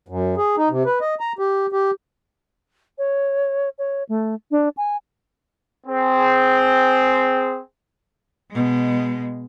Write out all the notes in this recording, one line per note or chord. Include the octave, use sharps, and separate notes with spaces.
F#2
G#4
D#4
C3
B4
D#5
A#5
G4
G4
C#5
C#5
A3
D4
G#5
C4 G#4
B2 G#3